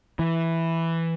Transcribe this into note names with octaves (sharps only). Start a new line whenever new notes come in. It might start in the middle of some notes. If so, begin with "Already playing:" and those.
E3